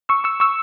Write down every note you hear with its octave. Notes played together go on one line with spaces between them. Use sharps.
C#6 E6
C#6 E6
C#6 E6